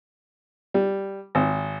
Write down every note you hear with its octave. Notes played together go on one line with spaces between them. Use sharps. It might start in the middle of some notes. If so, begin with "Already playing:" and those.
G3
G#1